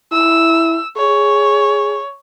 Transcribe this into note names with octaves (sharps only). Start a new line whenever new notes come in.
E4 E6
G#4 C#5